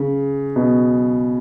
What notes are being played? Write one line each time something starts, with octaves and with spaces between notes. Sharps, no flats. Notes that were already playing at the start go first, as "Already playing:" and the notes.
Already playing: C#3
B2